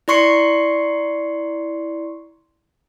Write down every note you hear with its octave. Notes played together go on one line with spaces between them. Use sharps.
E4 D5 C6 C#6 C7 C#7